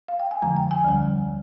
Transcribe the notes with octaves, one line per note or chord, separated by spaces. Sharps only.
F5
G5
G#5
F2 D3 F3 G#3 A#5
G5
G#5
D2 D3 G3